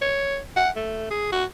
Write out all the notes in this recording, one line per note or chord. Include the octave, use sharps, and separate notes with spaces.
C#5
F#5
A3
G#4
F#4